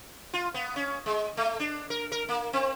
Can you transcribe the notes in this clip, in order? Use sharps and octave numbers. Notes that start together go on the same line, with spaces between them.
F4
B3
C#4
G#3
A3
D4
A#4
A#4
A#3
C4